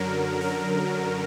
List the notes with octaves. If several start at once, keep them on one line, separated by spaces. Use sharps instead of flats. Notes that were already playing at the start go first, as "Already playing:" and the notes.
Already playing: F#2 D3 F#3 A#4
A#4